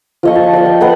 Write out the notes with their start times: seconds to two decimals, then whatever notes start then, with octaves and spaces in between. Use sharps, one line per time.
0.23 F3 D#5 C#6
0.35 A5
0.53 D5 D#5
0.66 G5
0.81 B4 F#5 G5 A#5